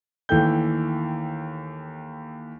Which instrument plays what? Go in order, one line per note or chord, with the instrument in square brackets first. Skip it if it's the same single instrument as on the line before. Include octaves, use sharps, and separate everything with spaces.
[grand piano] D#2 E3 A3 G5 G6